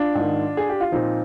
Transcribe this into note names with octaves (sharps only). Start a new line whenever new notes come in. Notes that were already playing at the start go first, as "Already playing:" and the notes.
Already playing: D4 F4
G#2
D#3
G#4
G4
F4
A#2 F3 C4 D#4